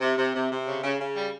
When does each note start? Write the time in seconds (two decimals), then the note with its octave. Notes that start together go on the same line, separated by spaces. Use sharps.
0.01 C3
0.18 C3
0.34 C3
0.50 C3
0.67 C#3
0.84 C#3
1.00 C#3
1.17 G3